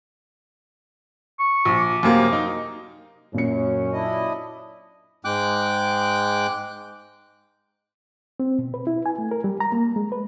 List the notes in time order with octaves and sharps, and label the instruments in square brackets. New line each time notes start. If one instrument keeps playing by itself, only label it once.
[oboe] C#6
[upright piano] A#1
[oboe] D6
[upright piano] F#2 C3 A#3
D#4
[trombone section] F#2 C#4 [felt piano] A#2 C#7
[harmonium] D4 E4 D#5
[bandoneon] G#2 G#3 G5 D6 F#6
[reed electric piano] C4
B2
B4
E4
G#5
A3
A#4
G3
A#5
A#3
G#3
B4